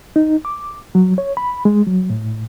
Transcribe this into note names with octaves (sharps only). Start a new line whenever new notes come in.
D#4
D6
F#3
C#5
B5
G#3
F#3
A2